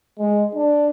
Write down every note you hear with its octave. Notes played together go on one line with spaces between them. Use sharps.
G#3
D4